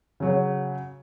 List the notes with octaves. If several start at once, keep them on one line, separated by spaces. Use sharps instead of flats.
C#3 F#3 C#5